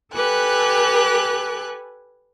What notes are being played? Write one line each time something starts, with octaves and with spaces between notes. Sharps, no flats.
G4 A4 B4 G#5 F#6